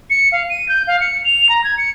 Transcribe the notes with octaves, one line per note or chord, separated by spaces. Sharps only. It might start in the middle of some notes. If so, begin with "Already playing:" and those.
C#7
F5
D#7
G6
F5
C#7
F7
A#5
G#6
C#7